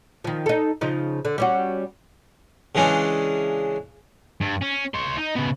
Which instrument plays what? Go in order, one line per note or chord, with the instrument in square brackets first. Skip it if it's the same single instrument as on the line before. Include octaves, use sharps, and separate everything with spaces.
[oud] D#3 F3
D#4 A4
C#3 F3 D#4
D3
G3 C#4 F#4
[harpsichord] C#3 E3 G#3 C#4 D4
[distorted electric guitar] G2
C#4
C#5 C6
D#4
C#3 B3